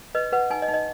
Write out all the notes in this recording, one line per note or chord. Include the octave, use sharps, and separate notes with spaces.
B4 D#5
B4 F#5
D#4 G#5
D#5
D#4
D#5